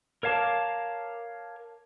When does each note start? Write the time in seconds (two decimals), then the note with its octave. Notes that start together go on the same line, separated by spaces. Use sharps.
0.23 A#4 C#5 F5 A5 D6